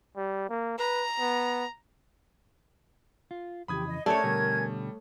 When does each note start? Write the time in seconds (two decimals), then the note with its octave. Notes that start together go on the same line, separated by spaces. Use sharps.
0.17 G3
0.50 A#3
0.78 B4 A#5
1.20 B3
3.31 F4
3.68 F2 C#3 E3 G4 B5 D#6 G#6
3.87 D#5
4.06 A3 C#4 A#4 C#5 D5 E5 G#5 G#6
4.24 B2 D3 G3